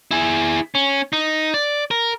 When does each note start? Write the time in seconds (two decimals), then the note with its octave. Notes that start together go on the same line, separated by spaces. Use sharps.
0.11 E4 G#4
0.75 C#4
1.13 D#4
1.54 D5
1.91 A#4